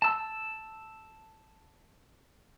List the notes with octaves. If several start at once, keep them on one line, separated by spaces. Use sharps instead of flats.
A5 E6